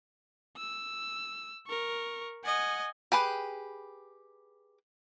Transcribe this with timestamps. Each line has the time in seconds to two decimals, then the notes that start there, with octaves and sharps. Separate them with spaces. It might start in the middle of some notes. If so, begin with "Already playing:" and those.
0.57 E6
1.67 A#4 C#6
2.44 D#5 F#5 G#5
3.12 G4 G#4 B4 G5